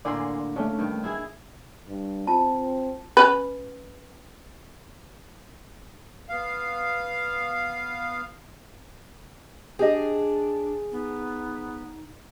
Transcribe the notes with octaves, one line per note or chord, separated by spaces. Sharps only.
A2 D3 A#3 D5 G#5 C6
C#3 A3 C#4 D4
G2 D#3
E4 G#4
G2
C4 F4 A5
C#4 B4
B3 F5
D4 G4 G#4 D#5
B3 D#4